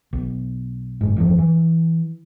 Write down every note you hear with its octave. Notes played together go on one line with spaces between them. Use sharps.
B1
F#1 G#2
F#1 E2 A#2 F3
E3